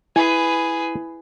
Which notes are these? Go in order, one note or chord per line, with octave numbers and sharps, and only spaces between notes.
E4 G#4 B4 G#5